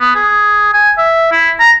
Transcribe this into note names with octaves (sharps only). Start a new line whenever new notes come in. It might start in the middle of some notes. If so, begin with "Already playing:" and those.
B3
G#4
G#5
E5
E4
A#5